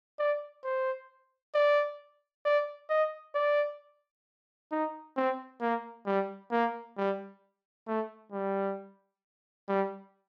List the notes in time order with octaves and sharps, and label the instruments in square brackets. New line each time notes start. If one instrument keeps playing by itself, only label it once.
[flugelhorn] D5
C5
D5
D5
D#5
D5
D#4
C4
A#3
G3
A#3
G3
A3
G3
G3